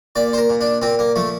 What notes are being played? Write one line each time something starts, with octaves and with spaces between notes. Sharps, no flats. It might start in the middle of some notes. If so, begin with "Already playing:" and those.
A#2 D5
C5
A#4
A#2
D4
A#2 C4
A#3
F3 A3